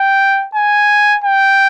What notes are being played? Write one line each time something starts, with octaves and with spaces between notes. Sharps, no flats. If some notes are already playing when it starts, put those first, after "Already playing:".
Already playing: G5
G#5
G5